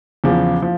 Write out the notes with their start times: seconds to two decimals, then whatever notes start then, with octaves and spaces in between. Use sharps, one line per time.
0.24 E2 C#3 F3
0.62 F3